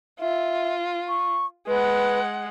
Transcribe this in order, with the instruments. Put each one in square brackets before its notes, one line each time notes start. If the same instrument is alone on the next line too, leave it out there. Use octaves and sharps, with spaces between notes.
[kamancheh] F4 [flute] E5
[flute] C#6
[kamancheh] G#3 F#5 [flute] B4